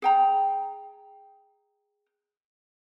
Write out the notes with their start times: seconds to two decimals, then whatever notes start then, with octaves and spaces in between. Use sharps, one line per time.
0.02 G#4 G5 A#5